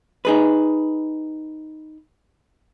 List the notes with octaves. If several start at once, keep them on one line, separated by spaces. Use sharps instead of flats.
D#4 G#4 B4